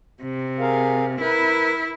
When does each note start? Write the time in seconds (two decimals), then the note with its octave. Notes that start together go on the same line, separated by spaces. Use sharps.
0.22 C3
0.59 G#4 A#4 F5
1.20 E4 A#4 B4